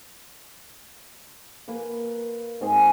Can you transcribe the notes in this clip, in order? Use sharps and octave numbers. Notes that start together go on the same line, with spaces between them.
A#3 B4
G#2 C4 G#4